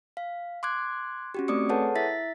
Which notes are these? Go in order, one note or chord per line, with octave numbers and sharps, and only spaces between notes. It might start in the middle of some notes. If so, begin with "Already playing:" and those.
F5
C6 D6 F#6 G#6
C#4 F#4 G4
A3 C4 D5 D6 D#6 C#7
G#4 A4 B4 C#5 F#5 A5
E4 E5 A6 B6